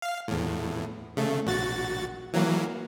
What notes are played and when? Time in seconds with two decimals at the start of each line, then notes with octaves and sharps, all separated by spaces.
0.02 F5
0.28 E2 A2
1.17 C#3 A3
1.47 A#1 F#4 A6
2.33 E3 F#3 A#3